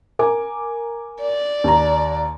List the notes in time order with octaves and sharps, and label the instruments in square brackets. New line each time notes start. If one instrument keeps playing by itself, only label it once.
[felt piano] A#4 G#5 D6
[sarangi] D5
[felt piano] D#2 A#5